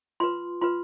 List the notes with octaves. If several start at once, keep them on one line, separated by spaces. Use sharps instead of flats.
F4 B4 C6
F4 B4 C6